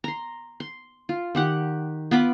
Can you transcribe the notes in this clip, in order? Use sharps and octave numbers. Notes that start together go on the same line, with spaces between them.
A#5 C6
C6
F4
D#3 G4 F#5
B3 F4 B5 D6